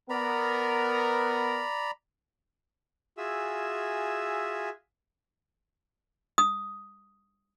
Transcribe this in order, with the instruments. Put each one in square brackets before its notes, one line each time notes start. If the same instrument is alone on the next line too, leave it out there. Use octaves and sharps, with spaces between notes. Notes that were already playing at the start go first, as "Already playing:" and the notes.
[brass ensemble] B3 A#4 [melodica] D5 A#5 B5
[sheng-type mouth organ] F4 F#4 G#4 E5 G#5 E6
[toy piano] D#6